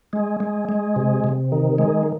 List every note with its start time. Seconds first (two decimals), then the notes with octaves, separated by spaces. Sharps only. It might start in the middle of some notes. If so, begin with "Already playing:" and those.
0.13 G#3
0.40 G#3
0.69 G#3
0.96 C3
1.24 C3
1.52 D#3
1.78 G#3